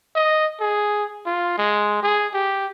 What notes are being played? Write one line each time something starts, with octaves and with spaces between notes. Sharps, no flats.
D#5
G#4
F4
G#3
G#4
G4